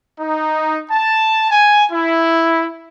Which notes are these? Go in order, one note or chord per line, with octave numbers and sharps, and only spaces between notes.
D#4
A5
G#5
E4